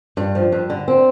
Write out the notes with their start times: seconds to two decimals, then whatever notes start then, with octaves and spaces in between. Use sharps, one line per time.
0.17 G2
0.35 F3
0.52 G2
0.70 D3
0.88 C4